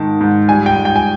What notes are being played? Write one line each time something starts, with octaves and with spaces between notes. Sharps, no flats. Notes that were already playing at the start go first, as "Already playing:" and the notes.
Already playing: G#2 D#3 G#3 A5
G#2
G3 G#5
G5
G#2
G5
G#5